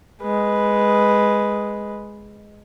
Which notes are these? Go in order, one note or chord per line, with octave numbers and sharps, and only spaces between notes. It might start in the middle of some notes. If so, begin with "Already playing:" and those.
G#3 B4